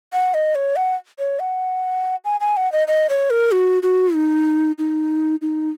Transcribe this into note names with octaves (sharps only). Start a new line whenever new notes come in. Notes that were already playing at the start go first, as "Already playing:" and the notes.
F#5
D#5
C#5
F#5
C#5
F#5
G#5
G#5
F#5
D#5
D#5
C#5
A#4
F#4
F#4
D#4
D#4
D#4